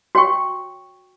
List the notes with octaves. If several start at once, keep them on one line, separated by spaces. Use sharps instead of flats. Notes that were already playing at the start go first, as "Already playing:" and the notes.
F#4 C#5 G5 C#6